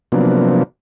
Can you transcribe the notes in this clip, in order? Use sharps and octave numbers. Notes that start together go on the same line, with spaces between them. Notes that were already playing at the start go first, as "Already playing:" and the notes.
C3 F3 F#3 A#3 B3 D4